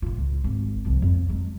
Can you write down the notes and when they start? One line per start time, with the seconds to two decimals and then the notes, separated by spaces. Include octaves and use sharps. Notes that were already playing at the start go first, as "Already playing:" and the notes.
0.02 A2 F4
0.18 C#2
0.44 G#1
0.85 C2 F3
1.02 F2
1.29 F#3 G#3